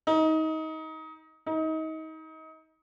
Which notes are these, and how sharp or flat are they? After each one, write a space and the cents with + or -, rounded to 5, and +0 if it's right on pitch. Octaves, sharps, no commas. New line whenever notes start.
D#4 +25
D#4 +30